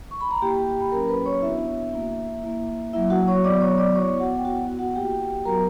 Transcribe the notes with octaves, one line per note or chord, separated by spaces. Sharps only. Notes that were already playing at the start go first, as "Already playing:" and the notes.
C#6
B5
A#5
A#3 E4 G4 G5
B5
F#3 A#3 C#4 A#4 A#5
B4 B5
C#5 C#6
B3 D4 E4 F#4 E5
A#3 E4
A#3 E4
F#3 A#3 E4 E5
F#4 F#5
C#5 C#6
F#3 B3 E4 D5 D6
C#5 C#6
D5 D6
B3 F#4 C#5 C#6
F#4 F#5
G5
B3 E4 F#4 F#5
F#4 F#5
A#3 E4 G4 G5
F#3 B3 F#4 A#4 A#5